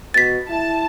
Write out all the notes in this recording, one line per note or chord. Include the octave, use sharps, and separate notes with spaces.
B2 A6 B6
E4 A5